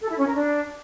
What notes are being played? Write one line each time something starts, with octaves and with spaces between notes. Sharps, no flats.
A4
E4
C#4
A#4
D4